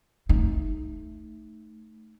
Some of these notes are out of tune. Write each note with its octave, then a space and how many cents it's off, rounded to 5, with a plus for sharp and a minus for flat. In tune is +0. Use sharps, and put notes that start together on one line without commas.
A3 +0 D#4 +0